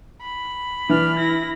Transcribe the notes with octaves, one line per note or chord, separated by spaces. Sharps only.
B5
E3 D4 F6
E4 A#6